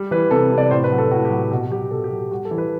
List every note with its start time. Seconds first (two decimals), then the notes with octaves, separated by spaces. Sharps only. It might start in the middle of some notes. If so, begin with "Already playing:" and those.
Already playing: G3
0.11 E3 B4
0.31 C3 A4
0.52 C3
0.58 D5
0.71 A2 C5
0.84 B4
0.92 F#3
0.98 A4
1.11 A2 F#4
1.25 G4
1.31 F#3
1.52 B2 F#4
1.71 F#3 G4
1.91 B2 A4
2.04 G4
2.11 F#3
2.31 G3 F#4
2.45 A4
2.51 E3
2.58 B4